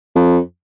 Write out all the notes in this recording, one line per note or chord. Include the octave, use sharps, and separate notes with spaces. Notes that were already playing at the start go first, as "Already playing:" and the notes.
F2